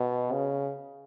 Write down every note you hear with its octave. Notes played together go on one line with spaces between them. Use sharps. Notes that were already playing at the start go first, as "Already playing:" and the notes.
Already playing: B2
C#3